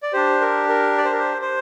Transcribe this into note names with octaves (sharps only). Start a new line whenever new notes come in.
D5
D4 G4 C5
A#4
A#4
D5
C5
A#4
C5
C5